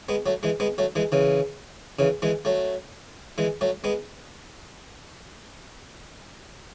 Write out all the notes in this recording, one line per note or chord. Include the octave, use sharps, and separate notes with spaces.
G#3 B3
F#3 A3
E3 G#3
G#3 B3
F#3 A3
E3 G#3
C#3 E3
C#3 E3
E3 G#3
F#3 A3
E3 G#3
F#3 A3
G#3 B3